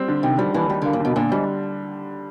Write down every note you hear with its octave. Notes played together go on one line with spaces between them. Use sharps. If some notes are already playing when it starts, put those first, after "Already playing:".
Already playing: G3 C4
D3
C3 D#3
F3 G3
D#2 E3
D#3 G3
D3 A#3
A#2
B2 D3
A#2 D3
G#2 G3